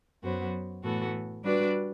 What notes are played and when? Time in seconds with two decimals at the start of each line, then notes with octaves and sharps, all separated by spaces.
0.22 F#2 F#3 B3 F#4 C5
0.83 A2 E3 B3 F#4 A4
1.43 G3 D4 F#4 B4 D5